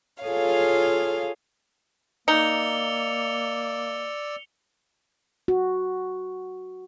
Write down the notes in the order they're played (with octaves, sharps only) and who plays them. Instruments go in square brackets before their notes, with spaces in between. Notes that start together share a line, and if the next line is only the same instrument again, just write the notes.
[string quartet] F4 G#4 A4 C#5 F5
[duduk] A#3 [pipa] D#4 [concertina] D5 E6 [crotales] C#7 F7 G7
[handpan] F#4